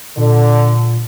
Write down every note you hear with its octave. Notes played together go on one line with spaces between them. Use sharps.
A#2 D3